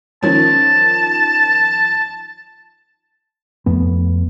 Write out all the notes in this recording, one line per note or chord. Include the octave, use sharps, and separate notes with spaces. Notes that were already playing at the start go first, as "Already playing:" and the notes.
D#3 F3 C#4 A5
F2 A3 B3